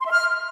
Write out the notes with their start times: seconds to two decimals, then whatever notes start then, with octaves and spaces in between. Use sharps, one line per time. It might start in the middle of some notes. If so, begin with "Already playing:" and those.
0.01 C6
0.06 E5
0.11 F6